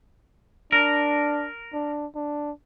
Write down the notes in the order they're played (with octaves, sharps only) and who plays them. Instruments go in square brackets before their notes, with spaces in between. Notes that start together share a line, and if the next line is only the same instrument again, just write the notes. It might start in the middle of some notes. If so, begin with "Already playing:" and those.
[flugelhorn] D4 [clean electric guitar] A#4
[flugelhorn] D4
D4